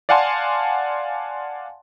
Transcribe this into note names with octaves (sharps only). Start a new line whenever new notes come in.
D5 F5 F#5 G#5 A5 C6